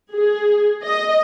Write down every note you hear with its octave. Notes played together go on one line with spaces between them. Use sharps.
G#4
D#5